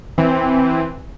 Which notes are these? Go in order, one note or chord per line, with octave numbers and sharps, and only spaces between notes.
E3 C4